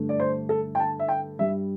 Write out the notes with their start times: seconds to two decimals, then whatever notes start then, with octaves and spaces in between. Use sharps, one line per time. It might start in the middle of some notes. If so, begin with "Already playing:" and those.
Already playing: G2 D3 A3
0.09 D5
0.20 C5
0.49 A4
0.75 G5
0.80 A5
0.99 E5
1.08 G5
1.38 G2 G3 E5